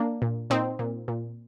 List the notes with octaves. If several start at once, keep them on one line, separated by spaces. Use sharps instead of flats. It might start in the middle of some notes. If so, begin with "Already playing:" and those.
Already playing: A#3 D4
A#2
A#2 C4 D#4
A#2
A#2